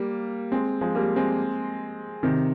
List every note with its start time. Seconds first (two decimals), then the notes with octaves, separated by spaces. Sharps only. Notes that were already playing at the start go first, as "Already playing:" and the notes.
Already playing: G3 A#3
0.52 G#3 C4
0.81 F3 G#3
0.95 G3 A#3
1.16 G#3 C4
2.23 C3 D#3